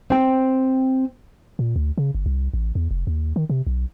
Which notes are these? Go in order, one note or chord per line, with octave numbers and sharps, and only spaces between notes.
C4 G5
A#2
D2
C#3
G1
C2
A1
E2
F1
D#2
D#3
C3
B1